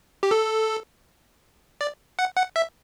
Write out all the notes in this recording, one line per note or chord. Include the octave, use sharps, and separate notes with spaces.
G4
A4
D5
F#5
F#5
E5